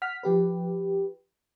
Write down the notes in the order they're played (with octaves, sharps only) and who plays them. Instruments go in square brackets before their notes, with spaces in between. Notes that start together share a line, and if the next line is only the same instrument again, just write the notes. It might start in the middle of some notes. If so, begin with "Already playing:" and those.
[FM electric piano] F#5 F6 B6
F3 G4 B4